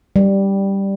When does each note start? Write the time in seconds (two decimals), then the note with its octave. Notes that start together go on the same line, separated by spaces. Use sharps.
0.16 G3